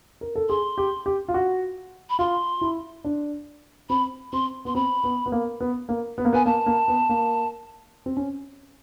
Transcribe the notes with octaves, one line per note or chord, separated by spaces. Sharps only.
A#4
A4
G#4 C6
G4
G4
F4
F#4
B5
F4 C6
E4
D4
C4 B5
C4 C6
B3 C6
C4 B5
B3
B3
A#3
B3
A#3
B3
A#3
B3 G#5
A#3 A5
A#3
B3
A#3
C4
C#4